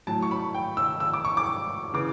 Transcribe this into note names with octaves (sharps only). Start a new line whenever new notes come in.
A2 F#3 A5
C#6
B5
G5
E6
E6
D6
C#6
D6
C#3 E3 D6